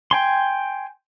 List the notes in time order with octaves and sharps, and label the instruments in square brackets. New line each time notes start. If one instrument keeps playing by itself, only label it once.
[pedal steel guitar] G5 G#5 C6